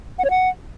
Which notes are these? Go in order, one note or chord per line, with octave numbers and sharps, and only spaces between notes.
F#5
C#5
F#5